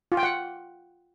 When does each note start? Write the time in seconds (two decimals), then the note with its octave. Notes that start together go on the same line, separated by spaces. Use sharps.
0.12 F4
0.17 G5
0.23 F#5